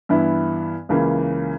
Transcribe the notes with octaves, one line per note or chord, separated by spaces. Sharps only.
G2 E3 B3 E4
C#2 C#3 E3 A#3